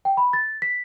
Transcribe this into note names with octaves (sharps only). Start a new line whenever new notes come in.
G5
B5
A6
B6